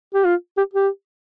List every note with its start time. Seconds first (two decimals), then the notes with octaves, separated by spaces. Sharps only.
0.14 G4
0.25 F4
0.57 G4
0.73 G4